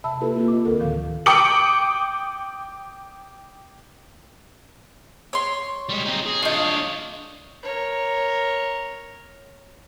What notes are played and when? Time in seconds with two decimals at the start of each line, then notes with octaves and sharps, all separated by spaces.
0.04 C3 E5 A5 B5 E6
0.21 A#3 E4 F4 G4 A4 B4
0.36 A#3 C4 F4 G4
0.48 D#5 D6
0.65 D2 D3 A4 A#4
0.79 D2 A2 D3 D#3 F3 F5
1.26 G5 D6 D#6 C#7 F#7
5.33 C#5 C6
5.90 G3 G#3
6.06 C4 D#4
6.26 G#4
6.43 D4 D#4 F4 C#5
7.63 A#4 C#5